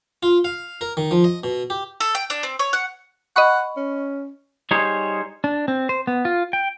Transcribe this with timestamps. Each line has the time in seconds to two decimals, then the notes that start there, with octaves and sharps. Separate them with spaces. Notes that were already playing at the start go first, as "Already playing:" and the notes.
0.23 F4
0.44 F5
0.81 A#4
0.97 D#3
1.11 F3
1.24 D#5
1.44 B2
1.70 G4
2.00 A4
2.15 G5
2.30 D4
2.43 C4
2.59 C#5
2.73 F#5
3.36 D#5 F#5 B5 C#6
3.77 C#4
4.71 G3 D#4 G#4 C5 C#5
5.44 D4
5.68 C4
5.89 C5
6.07 B3
6.25 F4
6.53 G5